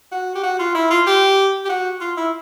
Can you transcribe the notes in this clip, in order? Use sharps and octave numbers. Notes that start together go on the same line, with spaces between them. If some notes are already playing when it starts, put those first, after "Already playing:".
F#4
G4
F#4
F4
E4
F4
G4
G4
F#4
F4
E4